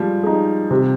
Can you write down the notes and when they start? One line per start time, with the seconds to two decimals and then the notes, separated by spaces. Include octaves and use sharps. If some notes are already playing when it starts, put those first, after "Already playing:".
Already playing: F3 G3 G#3
0.23 D#4 G#4
0.70 C3